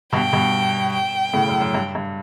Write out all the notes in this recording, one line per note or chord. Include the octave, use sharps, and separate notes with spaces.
G2 B2 G5
G2 B2
G5
A2 C#3
F#2
F#2
G2
G2